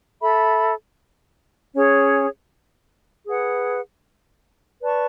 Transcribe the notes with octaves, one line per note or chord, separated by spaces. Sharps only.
A4 E5 B5
C#4 G#4 C#5
G#4 B4 F#5
B4 D5 A5 C#6